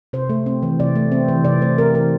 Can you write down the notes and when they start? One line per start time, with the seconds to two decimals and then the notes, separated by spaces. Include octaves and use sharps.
0.13 C3 C5
0.29 A3
0.46 C4
0.63 E3
0.80 C3 D5
0.95 A3
1.12 C4
1.28 E3
1.45 C3 D5
1.62 A3 C5
1.78 C4 A#4
1.94 E3 A#4